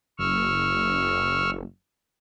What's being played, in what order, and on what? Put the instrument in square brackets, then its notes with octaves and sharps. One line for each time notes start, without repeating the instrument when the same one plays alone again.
[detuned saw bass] F#1 [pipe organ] C#6 E6 F6